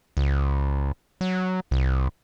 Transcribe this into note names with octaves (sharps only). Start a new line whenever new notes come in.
C#2
F#3
C2